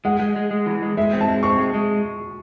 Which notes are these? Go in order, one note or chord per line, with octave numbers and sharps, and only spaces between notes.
G#3 F#5
G#3
G#3
G#3
E3
G#3
G#3 E5
C4
A5
G#3
C4 C#6
G#3
G#3